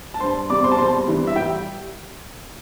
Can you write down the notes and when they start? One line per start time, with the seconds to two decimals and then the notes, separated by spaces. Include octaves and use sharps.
0.14 A5
0.20 G2 G3 C5 C6
0.49 E2 C3 G3 D5 D6
0.64 C5 C6
0.72 A5
0.78 E2 C3 G3 C5 C6
1.07 G2 E3 G3
1.27 E5
1.36 G3 G4 G5